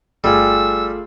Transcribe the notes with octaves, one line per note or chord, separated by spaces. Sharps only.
G1 G3 A3 F4 G#4 E6